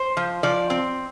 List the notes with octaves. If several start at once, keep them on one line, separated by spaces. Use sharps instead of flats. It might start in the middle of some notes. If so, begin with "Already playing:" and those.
Already playing: C5
F3
F3 D5
C4